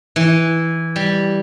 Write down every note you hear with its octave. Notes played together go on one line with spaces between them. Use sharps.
E3
G3